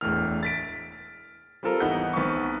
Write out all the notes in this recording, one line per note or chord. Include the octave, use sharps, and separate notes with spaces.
E1 E2 A2 F6
A6 B6 D7
G3 C4 F4 A4 A#4
G#1 E3 B3 D#4 F#5 G6
B1 B3 C4 C#6